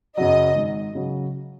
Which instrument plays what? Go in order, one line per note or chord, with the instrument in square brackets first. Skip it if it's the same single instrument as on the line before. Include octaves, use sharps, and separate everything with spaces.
[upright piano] F#2 C#3 F#3 [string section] D#5
[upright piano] G#1
C#3 F#3